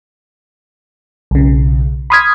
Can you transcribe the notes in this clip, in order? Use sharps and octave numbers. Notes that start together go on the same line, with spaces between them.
B1 C#3
B5 C6 D#6 F6 G#6 B6